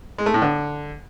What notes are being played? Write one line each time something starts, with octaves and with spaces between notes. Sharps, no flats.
G#3
A3
A2
D3